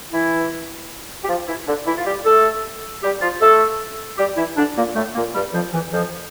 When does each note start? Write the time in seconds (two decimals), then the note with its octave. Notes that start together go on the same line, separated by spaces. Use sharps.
0.12 E3 E4
1.23 G4
1.28 F3 F4
1.47 E3 E4
1.67 D3 D4
1.86 E3 E4
1.97 F4
2.05 G3 G4
2.25 A3 A4
3.02 G3 G4
3.21 F3 F4
3.41 A3 A4
4.18 G3 G4
4.37 E3 E4
4.57 D3 D4
4.77 A#2 A#3
4.95 A2 A3
5.15 A#2 A#3
5.34 G2 G3
5.53 F2 F3
5.73 E2 E3
5.92 F2 F3